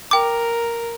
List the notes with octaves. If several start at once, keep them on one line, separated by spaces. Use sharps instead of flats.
A#4 G5 D6